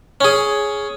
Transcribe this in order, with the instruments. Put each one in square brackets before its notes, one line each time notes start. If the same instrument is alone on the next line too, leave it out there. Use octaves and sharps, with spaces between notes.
[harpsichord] C#4 G#4